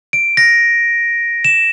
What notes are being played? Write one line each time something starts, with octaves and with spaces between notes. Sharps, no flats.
D7
A#6
E7